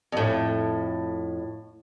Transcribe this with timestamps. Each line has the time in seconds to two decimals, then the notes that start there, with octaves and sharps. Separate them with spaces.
0.12 F2 A2